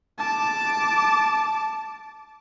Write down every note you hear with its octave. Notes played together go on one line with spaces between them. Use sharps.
A5 D6